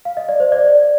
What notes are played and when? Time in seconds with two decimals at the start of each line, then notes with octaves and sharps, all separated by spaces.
0.05 F5
0.17 D#5
0.29 D5
0.40 C5
0.52 D5